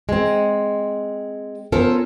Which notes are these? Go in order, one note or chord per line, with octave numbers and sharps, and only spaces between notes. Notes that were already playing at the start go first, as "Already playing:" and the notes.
G#3 C4
B3 C#4 F4 A4 A#4 C5